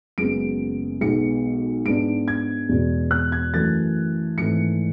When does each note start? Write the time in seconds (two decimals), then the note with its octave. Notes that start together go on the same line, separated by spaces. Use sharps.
0.18 F#1 F#2 C#3 G#3 B3 D7
1.01 B1 B2 G#3 B3 C#7
1.85 G#2 G#3 B3 D4 D7
2.28 G#6
2.69 E2 B2 G#3
3.11 F#6
3.32 G#6
3.53 F#2 E3 A3 A6
4.37 G#1 G#2 E3 A3 C#7